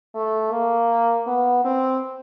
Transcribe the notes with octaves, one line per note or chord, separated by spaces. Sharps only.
A3
A#3
B3
C4